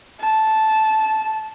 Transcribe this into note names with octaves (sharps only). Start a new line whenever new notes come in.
A5